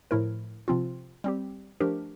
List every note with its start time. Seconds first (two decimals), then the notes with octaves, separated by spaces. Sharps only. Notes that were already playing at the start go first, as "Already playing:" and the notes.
0.11 A2 F3 A3 E4 A#4
0.68 C3 F3 C4 F4
1.24 G3 C4 G4
1.80 F3 A3 D4 G4 A#4